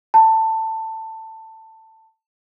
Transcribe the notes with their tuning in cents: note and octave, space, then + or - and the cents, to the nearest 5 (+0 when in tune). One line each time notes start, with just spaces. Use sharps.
A5 +15